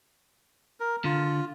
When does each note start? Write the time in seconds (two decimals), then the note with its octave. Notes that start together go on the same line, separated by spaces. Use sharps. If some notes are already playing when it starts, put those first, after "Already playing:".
0.80 A#4
1.04 D3 F4